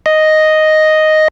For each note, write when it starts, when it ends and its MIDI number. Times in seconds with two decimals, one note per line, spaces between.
0.06 1.28 75